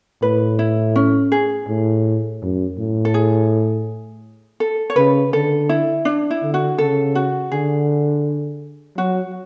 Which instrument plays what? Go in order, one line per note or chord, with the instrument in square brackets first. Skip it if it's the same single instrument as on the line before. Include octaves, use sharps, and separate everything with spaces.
[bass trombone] A2 [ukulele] B4
[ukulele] E4
C#4
G#4
[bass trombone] A2
F#2
A2
[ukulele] A4
G#4
A4
C#5
[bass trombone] C#3 [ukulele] B4
[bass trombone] D3 [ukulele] A4
[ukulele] E4
D4
E4
[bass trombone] D3
[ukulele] F#4
[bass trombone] C#3 [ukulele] A4
[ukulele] F#4
[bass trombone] D3 [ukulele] G#4
[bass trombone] F#3 [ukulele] F#4